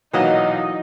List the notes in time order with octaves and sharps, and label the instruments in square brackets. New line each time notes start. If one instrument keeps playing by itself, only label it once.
[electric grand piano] B1 A#2 F5 [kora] E3 F#3 [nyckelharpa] D#4 [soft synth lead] D#5